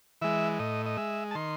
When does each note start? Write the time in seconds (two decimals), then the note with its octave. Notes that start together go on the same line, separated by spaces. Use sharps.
0.22 E3 G#3 E5
0.59 A2 D#5
0.86 D#5
0.97 G#3 E5
1.31 A5
1.35 D#3 C6